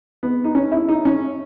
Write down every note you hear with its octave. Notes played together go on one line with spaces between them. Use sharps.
B3
D#4
C#4
E4
D#4
C#4